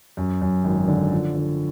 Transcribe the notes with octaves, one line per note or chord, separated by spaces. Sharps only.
F#2
F#2
G#1
D3
F3
D3